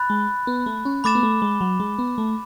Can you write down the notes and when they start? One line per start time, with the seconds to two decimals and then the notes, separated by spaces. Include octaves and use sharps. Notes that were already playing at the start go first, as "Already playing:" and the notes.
Already playing: B5 F#6 A6
0.10 G#3
0.47 B3
0.66 A3
0.85 C#4
1.04 A3 B5 D6 A6 E7
1.15 B3
1.23 A3
1.42 G#3
1.61 F#3
1.80 G#3
1.99 B3
2.18 A3